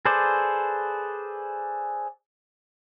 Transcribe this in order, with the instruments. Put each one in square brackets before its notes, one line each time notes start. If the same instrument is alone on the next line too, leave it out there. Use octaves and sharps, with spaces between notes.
[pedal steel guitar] G#4 A4 B4 C5 D5